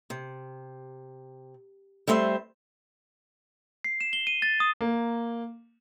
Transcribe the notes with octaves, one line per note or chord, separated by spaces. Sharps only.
C3
G3 A3 C4 C5 E5
C7
E7
G7
D#7
A6
D#6
A#3